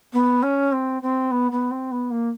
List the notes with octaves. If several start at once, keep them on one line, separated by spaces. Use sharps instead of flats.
B3
C#4
C4
C4
B3
B3
C4
B3
A#3